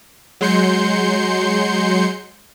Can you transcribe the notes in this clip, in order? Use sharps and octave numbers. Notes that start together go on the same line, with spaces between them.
F#3 G#3 C6 G6 C#7